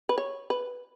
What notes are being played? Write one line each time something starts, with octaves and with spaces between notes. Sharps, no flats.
B4
C#5
B4